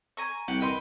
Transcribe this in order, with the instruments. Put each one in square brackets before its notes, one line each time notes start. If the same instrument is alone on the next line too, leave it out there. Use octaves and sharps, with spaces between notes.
[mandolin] G#5 A#5 C#6
[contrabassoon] C2 [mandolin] G4 F#5
[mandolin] A#4 D#5 C6 [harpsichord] B4 G5